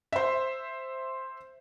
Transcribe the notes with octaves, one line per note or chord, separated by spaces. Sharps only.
C5 E5